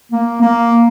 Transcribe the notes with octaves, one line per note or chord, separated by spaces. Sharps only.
A#3
A#3